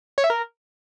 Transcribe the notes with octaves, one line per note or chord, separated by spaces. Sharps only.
C#5
E5
A#4